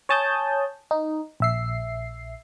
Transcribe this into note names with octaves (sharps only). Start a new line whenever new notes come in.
C#5 G#5 A5 D#6 G6
D#4
A#1 E5 C7